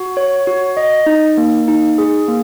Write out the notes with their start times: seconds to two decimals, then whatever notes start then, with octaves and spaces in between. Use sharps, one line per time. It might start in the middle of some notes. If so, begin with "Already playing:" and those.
Already playing: F#4
0.17 C#5
0.47 F#4
0.77 D#5
1.06 D#4
1.37 A#3
1.68 D#4
1.98 G#4
2.28 A#3